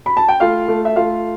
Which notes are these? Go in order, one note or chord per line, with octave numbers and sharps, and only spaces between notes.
B5
A5
G5
A3 F4 F5
A3
E5
A3 F4 F5